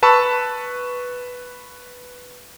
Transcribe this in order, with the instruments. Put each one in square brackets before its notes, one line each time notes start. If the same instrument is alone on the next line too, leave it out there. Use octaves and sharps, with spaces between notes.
[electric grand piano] B4 A5 B5 C#6 E6